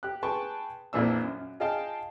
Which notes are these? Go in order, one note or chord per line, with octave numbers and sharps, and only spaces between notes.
G4 F#6
G#4 B4 G5 A5 C6 C#6
A#1 F2 A#2 E3 D4 E6
F#2
F4 G#4 D#5 F5 G5 A5